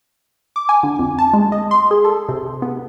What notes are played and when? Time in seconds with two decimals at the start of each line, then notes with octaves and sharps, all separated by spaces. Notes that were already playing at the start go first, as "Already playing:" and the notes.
0.56 D6
0.69 G#5
0.83 D3
0.99 F2
1.19 A5
1.33 G#3
1.52 D#5
1.71 C6
1.91 G#4
2.05 A4
2.29 C3
2.62 B3